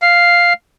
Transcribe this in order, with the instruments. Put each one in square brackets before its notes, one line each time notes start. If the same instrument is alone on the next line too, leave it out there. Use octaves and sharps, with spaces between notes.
[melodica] F5